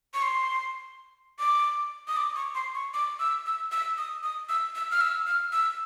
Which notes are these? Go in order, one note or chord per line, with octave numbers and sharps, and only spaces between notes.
C#6
C6
D6
D#6
D6
C#6
C6
C#6
D6
E6
E6
E6
D#6
D#6
E6
E6
F6
E6
F6
E6